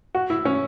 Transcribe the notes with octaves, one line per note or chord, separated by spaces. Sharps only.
F#4
E4
C#4